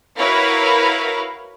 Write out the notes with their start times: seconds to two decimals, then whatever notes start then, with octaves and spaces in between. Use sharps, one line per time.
0.17 E4 F#4 A#4 B4 C#5 F5